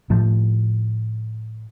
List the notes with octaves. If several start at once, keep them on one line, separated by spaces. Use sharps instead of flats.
A2 F3